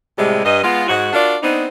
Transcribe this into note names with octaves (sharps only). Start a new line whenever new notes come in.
A2 C3 G3 G#3
G2 D#5
G#3 B3 F4
G#2 F#4
D4 F4 F#4 A#4 D5
B3 C4 D4 D#4